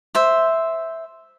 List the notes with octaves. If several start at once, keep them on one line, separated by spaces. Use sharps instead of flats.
C5 E5